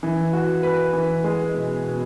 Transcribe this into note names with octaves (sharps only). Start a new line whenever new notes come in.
E3
F#4
B4
E3
G#3
B2
B2